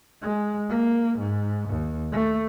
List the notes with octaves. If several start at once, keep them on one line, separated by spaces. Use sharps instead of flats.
G#3
A#3
G#2
D#2
A3